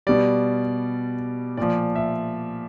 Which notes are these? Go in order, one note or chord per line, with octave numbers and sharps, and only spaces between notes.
B2 G3 D5
A#2 F3 D5
E5